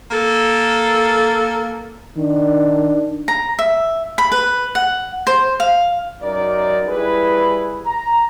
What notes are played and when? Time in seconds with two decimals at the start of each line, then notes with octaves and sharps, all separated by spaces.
0.11 A#3 A4
2.17 D#3 D4
3.28 A#5
3.59 E5
4.18 B5
4.32 B4
4.75 F#5
5.27 C5
5.60 F5
6.22 F#2 D#4 A#4 D5
6.87 G3 E4 G#4 B4
7.86 A#5